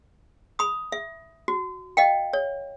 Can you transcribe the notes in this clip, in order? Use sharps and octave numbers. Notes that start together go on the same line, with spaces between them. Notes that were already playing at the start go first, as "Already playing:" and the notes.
B5 D#6
E5
F#4
D#5 F5 G5
C#5